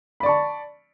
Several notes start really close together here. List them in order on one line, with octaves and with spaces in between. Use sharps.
B5 D5 C#6 A5